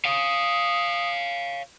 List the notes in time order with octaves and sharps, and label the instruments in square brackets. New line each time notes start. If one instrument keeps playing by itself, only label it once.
[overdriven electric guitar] C#5 F5 [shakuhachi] D#6